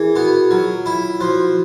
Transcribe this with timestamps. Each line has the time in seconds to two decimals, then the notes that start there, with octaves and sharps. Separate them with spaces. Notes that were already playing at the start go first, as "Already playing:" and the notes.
Already playing: E3 G#4 A#4
0.16 B3 F#4
0.51 F#3 F4
0.86 E4
1.20 F3 F#4